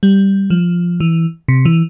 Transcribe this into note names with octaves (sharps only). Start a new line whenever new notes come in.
G3
F3
E3
C3
E3